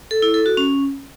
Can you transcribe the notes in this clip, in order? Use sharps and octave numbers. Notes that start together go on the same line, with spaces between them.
A4
E4
A4
F#4
C#4